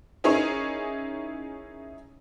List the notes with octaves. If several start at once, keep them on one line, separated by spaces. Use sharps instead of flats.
C#4 D#4 E4 G#4 A#4 C#5